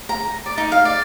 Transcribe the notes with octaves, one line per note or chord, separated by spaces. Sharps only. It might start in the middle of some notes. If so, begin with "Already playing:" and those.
A#5
D5
D#4
F5
D5